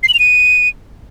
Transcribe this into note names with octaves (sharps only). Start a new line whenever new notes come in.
C7
F#7
F7
D#7